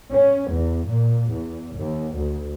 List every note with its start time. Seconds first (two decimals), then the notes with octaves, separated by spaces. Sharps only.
0.13 C#4
0.52 E2
0.88 A#2
1.32 E2
1.77 D#2
2.15 D2